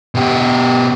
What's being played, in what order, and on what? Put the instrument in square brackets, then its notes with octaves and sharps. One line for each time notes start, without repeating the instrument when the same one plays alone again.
[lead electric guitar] B2 G4